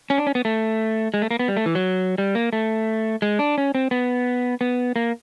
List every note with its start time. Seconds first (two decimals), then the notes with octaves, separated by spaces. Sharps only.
0.10 C#4
0.18 D4
0.27 C#4
0.35 B3
0.45 A3
1.14 G#3
1.22 A3
1.31 A#3
1.39 B3
1.48 G3
1.57 A3
1.66 E3
1.75 F#3
2.18 G3
2.35 A#3
2.53 A3
3.22 G#3
3.39 D4
3.58 C#4
3.75 C4
3.91 B3
4.61 B3
4.96 A#3